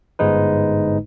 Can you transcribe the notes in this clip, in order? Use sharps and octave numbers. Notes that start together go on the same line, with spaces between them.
G1 G#2 G#3 D#4 B4